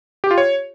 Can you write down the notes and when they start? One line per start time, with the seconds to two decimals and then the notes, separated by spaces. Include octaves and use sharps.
0.24 G4
0.31 F4
0.38 C#5